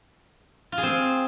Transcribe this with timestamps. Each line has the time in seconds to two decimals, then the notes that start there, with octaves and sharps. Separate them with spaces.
0.72 F4
0.78 G#4
0.83 C4